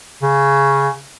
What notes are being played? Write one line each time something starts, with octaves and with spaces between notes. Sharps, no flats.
C#3